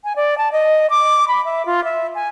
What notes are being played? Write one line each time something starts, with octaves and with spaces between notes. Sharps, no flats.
G#5
D5
A5
D#5
D6
B5
E5
F4
E5
G#5